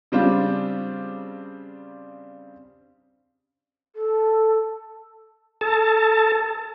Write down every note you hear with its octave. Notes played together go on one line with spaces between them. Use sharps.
C#3 G3 C4 D4 F4
A4
A4 A5